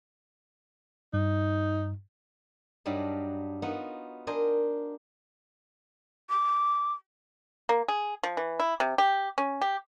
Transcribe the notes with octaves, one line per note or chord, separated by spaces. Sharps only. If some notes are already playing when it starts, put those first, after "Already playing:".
G2 D#4
G2 F#3 G3 D4 D#4
B3 D#4 F4 F#4 B4
D4 A#4 C5 D#5 G#5
D6
A#3
G#4
F3
E3
E4
C3
G4
C#4
G4